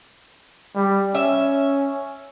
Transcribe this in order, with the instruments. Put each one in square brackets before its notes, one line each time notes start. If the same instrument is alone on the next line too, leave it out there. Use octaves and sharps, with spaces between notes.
[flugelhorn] G3
[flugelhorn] C#4 [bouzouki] E5